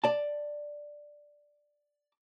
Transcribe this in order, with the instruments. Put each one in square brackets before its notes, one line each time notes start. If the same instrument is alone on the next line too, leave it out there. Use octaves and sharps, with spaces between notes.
[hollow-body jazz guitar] D5 A5